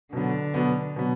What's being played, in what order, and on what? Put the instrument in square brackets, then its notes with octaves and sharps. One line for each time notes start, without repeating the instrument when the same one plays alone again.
[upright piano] B2 F#3 B3 [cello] D3
[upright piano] B2 F#3 B3
B2 F#3 B3